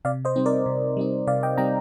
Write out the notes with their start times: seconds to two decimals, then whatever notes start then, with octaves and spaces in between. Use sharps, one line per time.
0.05 C3 D5 F5
0.25 C5 D#5
0.36 G3 C4 D#4
0.46 A#4 D5
0.66 C3
0.97 G3 C4 D#4
1.27 C3 D5 F5
1.43 D#5 G5
1.58 G3 C4 D#4 G5 A#5